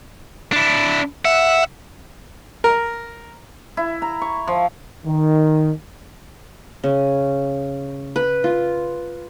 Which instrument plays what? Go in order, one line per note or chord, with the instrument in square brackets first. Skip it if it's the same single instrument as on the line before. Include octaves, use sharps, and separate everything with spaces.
[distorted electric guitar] D4 E4
[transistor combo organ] E5 [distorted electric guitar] F#5
[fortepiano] A#4
[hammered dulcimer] E4
A#5
C#6
F3
[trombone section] D#3
[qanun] C#3
B4
F4